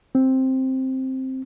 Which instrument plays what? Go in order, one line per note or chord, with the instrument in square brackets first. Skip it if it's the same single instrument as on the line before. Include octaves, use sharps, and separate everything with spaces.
[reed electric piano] C4